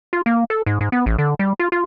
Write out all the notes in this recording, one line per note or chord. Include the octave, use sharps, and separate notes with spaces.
F4
A#3
A4
G#2
G#2
B3
A1
D3
G3
F4
F4